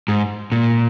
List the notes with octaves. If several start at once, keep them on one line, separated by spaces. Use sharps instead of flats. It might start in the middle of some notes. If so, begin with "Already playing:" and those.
G#2
A#2